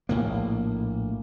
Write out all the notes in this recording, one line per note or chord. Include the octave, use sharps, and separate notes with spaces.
A#1 A2 A#3